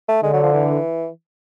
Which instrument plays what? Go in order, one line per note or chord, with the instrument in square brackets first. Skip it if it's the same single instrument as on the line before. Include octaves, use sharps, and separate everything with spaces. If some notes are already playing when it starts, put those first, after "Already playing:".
[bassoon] A3
[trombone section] D3 [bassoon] G#3
[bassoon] F#3
F3
E3